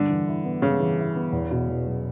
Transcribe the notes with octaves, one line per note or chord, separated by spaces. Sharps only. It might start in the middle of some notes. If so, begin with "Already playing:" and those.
Already playing: G2 D3
E3
E4
B3
G2 C#3
E3
E4
B3
E2
B2
E2
F#3